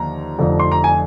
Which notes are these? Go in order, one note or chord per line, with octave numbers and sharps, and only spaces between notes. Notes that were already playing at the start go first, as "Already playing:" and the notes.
Already playing: D#2 D3 F3 A#5
F1 F2 D3 F3
C6
A#5
G#5